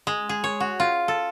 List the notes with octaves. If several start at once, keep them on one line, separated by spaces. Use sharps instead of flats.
G#3
G#4
C#5
F#4
F4
A4